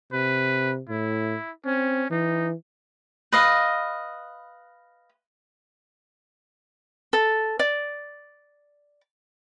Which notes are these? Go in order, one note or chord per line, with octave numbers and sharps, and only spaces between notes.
C3 B4
A2 E4
C4 C#4
E3 D#4
B4 D#5 F5
A4
D5